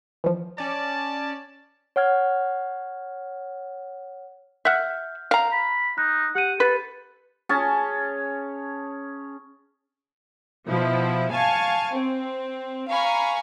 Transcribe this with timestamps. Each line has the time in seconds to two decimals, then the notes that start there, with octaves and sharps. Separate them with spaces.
0.24 E3 F3
0.58 C#4 D5 A5
1.96 C#5 F#5 F6 G#6
4.65 E5 F#5 F6 G6
5.31 F5 A#5
5.52 B5
5.98 D#4 F#6
6.35 G4 F#5 G6 D#7
6.60 A4 B4
7.49 C#4 G#4 A5
10.67 B2 F3 E4
11.30 F5 G#5 A5 C#6
11.93 C4
12.90 F5 G#5 A#5 B5 C#6